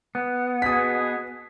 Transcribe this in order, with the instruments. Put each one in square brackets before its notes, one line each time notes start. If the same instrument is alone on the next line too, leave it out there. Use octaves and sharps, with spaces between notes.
[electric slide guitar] B3
[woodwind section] B2 G#4 [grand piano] D#6 B6